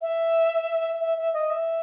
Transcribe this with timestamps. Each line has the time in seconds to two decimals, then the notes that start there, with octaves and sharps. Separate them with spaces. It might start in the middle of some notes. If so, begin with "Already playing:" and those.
0.02 E5
1.00 E5
1.18 E5
1.34 D#5
1.50 E5